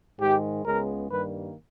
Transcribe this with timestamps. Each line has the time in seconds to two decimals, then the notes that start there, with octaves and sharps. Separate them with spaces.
0.19 G#2 D#3 G#3 G4
0.64 C#2 C#3 G#3 B3 A#4
1.09 G2 D#3 G3 A#3 B4